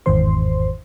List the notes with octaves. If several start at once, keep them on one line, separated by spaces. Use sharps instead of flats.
G1 E2 G#2 D#3 C5 C6